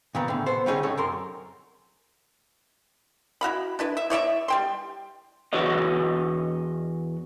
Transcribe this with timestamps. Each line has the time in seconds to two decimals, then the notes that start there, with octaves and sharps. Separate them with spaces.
0.15 A#2 D#3 B3
0.28 A2 D3
0.46 B3 A4 C5
0.66 D3 G3 C#4 D#4 G#4 C#5
0.83 A2 C3 A3 C#5
0.97 F#2 A#4 C6
3.41 E4 F#4 F5 B5
3.79 D4 E4 B4
3.97 E5
4.10 E4 C#5 D5 E5
4.48 G3 G5 C6
5.53 E2 F#4 B4 C#5 D#5